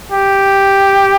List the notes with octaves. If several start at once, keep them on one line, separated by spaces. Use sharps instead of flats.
G4